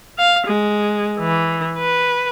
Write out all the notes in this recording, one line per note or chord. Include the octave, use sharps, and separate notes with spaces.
F5
G#3
E3
B4